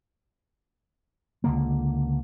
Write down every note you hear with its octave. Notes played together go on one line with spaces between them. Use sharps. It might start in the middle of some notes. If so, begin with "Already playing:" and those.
C#2 D3 A#3